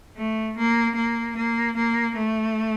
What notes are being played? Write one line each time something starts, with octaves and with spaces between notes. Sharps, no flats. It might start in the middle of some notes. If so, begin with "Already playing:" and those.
A3
A#3
A#3
A#3
A#3
A3